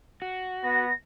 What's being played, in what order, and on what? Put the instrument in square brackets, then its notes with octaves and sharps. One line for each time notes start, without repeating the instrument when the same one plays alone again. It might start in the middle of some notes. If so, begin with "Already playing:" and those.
[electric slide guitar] F#4
[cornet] B3 [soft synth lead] A#6